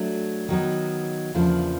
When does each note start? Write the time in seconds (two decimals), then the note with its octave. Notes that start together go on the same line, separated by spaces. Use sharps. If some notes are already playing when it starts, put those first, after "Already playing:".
Already playing: F#3 A3 D4
0.48 D#3 F#3 B3 D#4
1.34 E2 C#3 F3 A#3 D4